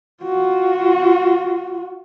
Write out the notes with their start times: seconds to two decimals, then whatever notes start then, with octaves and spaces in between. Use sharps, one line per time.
0.24 F4 F#4